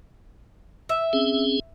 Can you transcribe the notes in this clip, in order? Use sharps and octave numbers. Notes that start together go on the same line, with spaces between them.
E5
C4 C#4 G#4